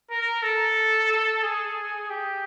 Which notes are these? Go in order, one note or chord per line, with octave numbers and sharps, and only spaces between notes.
A#4
A4
G#4
G4